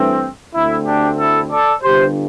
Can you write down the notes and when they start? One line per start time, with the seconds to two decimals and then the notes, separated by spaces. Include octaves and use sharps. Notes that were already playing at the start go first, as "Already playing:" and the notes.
Already playing: G2 E3 A3 C4
0.53 D2 D3 A3 C4 E4
0.85 D4 G4
1.18 E4 A4
1.50 A4 D5
1.82 G1 G2 D3 G4 C5